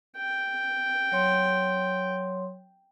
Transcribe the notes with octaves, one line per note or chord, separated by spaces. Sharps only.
G5
F#3 C#5 C6